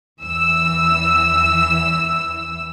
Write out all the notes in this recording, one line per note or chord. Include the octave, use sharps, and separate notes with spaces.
E2 E3 E6